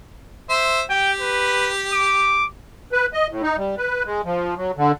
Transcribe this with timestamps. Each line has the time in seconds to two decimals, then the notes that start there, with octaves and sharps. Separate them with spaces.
0.49 C5 E5
0.90 G4 G5
1.20 B4
1.93 D6
2.92 B4
3.13 D#5
3.30 A2
3.42 D#4
3.57 G3
3.78 B4
4.05 G#3
4.25 F3
4.57 F#3
4.77 D3